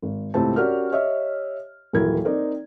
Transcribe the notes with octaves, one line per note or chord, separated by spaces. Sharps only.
G#1
C#2 A2 C4 G4 A5
C#4 F#4 G4 A#4 D5 F6
G4 C#5 D#5 E5
D#1 E3 F#3 E4 A#4 G#6
C4 D#4 A#4 D5